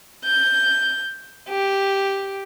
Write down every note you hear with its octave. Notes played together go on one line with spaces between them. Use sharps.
G6
G4